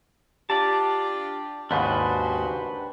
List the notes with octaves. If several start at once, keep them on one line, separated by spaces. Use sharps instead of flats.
D4 F4 G4 D5 A5
D#2 G#2 C#3 D4 F#4 G4 B4 C5